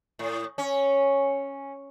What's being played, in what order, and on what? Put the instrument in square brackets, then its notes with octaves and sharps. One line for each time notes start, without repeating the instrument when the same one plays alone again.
[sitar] A2
C#4